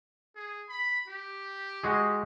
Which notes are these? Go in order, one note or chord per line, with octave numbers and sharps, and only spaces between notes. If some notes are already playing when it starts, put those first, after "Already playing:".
G#4
B5
G4
G#3 F#4 G#4